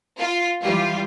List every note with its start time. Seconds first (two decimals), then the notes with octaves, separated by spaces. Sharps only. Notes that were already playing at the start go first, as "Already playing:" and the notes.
0.18 F4
0.61 E3 G3 F4